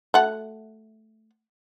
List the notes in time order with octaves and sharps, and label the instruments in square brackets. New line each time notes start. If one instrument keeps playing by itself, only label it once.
[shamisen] A3 F#4